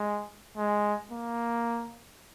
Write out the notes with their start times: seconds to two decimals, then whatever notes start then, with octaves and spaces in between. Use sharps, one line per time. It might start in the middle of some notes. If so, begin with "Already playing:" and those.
Already playing: G#3
0.57 G#3
1.11 A#3